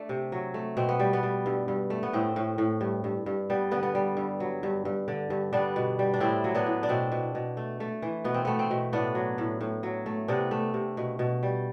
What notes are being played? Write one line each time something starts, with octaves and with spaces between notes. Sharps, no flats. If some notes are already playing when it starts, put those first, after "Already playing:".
Already playing: A3 D4
C3
F#3
A3
B2 C4
B3
G3
B3
G3
G2
G2
A3
B3
A2 C4
A2
A2
G2
G2
G2
G3 B3
D3 B3
B3
G3
G2
F#3
G2
G2
D3
G2
G3 B3 D4
B2
G3
D4
A2 C4 E4
F#3
B3 D4
A2
D4
B2 C4
B2
B2
A3
A3
E3
B2 B3
C4
A3 B3
C4
B2
A2 B3 D4
F#3
A2
A2
F#3
A3
C3 B3 D4
A3
C3
B2
B2
G3